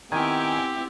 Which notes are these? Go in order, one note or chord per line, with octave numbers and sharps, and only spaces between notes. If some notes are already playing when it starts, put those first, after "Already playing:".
D#3 B3 C4 E4 G4 G#5